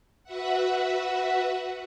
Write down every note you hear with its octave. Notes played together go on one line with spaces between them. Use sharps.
F#4 B4 E5 F#5